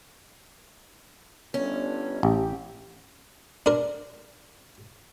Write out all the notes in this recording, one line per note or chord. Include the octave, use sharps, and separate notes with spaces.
G1 C#4
A1 G4
D4 A#4